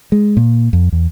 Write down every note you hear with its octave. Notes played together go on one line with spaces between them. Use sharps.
G#3
A#2
F2
E2